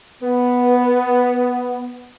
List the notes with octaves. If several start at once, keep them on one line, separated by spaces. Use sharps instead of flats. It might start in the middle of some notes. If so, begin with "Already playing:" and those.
B3 B4